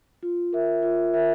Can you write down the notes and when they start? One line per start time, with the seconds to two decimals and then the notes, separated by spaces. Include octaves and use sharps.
0.23 F4
0.53 A#4 E5
0.83 F4
1.14 A#4 E5